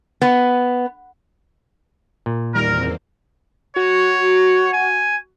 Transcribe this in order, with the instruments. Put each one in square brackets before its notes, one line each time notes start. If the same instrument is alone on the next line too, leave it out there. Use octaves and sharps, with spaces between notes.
[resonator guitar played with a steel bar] B3
[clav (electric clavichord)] A#2
[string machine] E2 A#3 C4 [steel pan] D#3 G3 [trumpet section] A#4
[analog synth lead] F#4 [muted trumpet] C#5
[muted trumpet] G#5